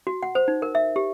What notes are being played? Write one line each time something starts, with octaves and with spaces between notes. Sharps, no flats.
F#4
F#5
C5
D#4
A#4
E5
G4